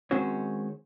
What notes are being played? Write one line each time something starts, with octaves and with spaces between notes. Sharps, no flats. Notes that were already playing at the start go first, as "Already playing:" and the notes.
D#3 G#3 C4 C#4 F#4 C#5